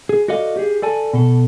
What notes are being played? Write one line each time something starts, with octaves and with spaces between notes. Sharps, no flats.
G#4
F#4 A4 D5 D#5 F5
G4 G#4
A4 D5 G#5 A5
B2 A4